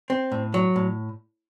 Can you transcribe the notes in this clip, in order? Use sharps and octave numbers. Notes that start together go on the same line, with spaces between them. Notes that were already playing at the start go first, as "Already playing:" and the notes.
C4
A2
F#3
A2